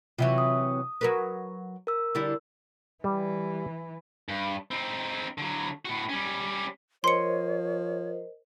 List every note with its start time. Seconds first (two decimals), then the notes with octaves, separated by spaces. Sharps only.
0.18 C3 E3 F#3 F4 E5
0.38 D#6
1.01 F#3 A#4 B4
1.87 A#4 E6
2.15 D3 G3 E4
3.04 E3 G3
4.29 G2
4.71 C4 D#4
5.38 D3 F#3
5.85 A2 F#4
6.09 G3 C#4
7.04 F3 A#4 C5 C#5 D#5 C6 C#7